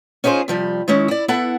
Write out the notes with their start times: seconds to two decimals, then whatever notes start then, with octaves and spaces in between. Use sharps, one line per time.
0.24 C#4 D#4 F4 G#4 C5
0.48 C3 F3 G3
0.88 D#3 G#3 C#4 E4
1.08 E4 D5
1.28 B3 E4 A4 E5 F#5